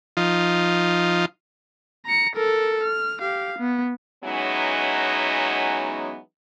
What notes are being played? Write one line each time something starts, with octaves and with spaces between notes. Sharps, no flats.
F3 D#4 F4
A#5 C#7
A4 A#4
F6
G4 F5
B3
E3 F#3 G#3 B3 C#4 D#4